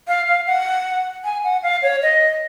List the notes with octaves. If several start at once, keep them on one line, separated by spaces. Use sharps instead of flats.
F5
F5
F#5
G#5
F#5
F5
C#5
D#5